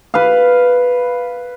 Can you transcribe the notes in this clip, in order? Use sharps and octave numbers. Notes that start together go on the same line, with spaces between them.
B4 F5